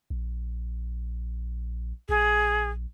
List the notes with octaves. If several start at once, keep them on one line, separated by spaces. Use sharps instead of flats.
A#1
A#1 G#4